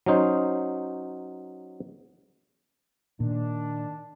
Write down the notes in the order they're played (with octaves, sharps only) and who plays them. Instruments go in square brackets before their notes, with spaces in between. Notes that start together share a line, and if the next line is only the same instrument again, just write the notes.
[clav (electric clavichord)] F#3 C#4 D#4 C5
[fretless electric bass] A#2 [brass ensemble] D#3 D4